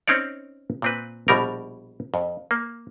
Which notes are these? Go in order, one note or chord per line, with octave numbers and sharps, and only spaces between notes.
C4 C#4 D#4 C#5 D5
A#2 C4 B4
A#1 B2 G3 A#4
F2
A#3